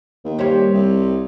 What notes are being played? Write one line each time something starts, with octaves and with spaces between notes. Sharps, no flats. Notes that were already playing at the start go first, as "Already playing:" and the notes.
D#2
G3 G4 C5 C#5
C2